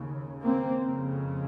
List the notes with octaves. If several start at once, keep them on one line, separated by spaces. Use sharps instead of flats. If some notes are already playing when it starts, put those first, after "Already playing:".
Already playing: D#2 C#3
A#3 C4
F2 C#3